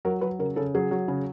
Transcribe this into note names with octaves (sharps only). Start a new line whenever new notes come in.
F#3 A#4
F#3 B4
C#3 A#4
C#3 A4
F#3 G#4
F#3
C#3